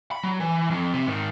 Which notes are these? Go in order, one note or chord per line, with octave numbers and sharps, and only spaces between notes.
B5
F#3
E3
F2
C3
G#2 D#3